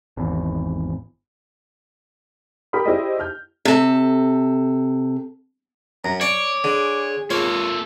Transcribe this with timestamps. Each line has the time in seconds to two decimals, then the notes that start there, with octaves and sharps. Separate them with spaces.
0.17 G#1 E2
2.73 G4 A#4 G5 B5 D#6
2.86 E4 G4 G#4 C5 D5 D#5
3.19 F6 G6
3.65 C3 A4
6.05 F#2 A#5
6.21 C#5 D5 D6
6.64 D3 G#4
7.30 A#3 F4 A4 C#5